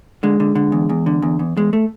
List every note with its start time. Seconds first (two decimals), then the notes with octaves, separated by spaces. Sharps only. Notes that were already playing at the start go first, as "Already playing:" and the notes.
0.23 D3 G#3
0.40 D3
0.55 D3
0.72 E2
0.89 E2
1.06 D3
1.22 E2
1.39 E2
1.57 E2 G#3
1.73 A3